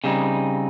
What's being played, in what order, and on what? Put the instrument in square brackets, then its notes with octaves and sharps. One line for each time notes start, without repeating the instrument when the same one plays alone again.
[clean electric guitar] C#3 G3 C4 D#4